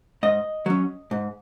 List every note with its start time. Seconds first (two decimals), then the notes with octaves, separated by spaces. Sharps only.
0.23 G#2 D#5
0.66 F#3 C#4
1.11 G#2